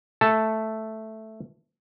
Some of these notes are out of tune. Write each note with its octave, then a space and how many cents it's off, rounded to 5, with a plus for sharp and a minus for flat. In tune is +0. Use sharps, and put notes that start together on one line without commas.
A3 +0 A4 +0 A5 +0